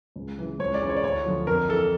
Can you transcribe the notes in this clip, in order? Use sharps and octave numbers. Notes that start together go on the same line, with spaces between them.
C#2
C#3 E3
C#2 C#5
D5
C#3 E3
C#5
D5
D2 C#5
D3 F3
F2 A#4
E3 A4